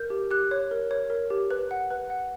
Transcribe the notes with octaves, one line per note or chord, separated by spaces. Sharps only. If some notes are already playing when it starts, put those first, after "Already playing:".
Already playing: A#4 G6
G4
G4 F#6
C#5
A#4
C#5
A#4
G4
B4
F#5
B4
F#5